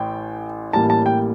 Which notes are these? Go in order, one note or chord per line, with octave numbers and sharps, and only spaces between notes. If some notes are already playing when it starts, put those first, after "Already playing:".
Already playing: A1 A2 G5
A1 A2 G3 A#3 A5
A5
G5